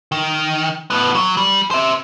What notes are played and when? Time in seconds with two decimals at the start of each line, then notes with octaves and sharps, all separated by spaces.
0.12 D#3
0.90 A2 B3
1.15 F#3
1.37 G3
1.71 C5 E5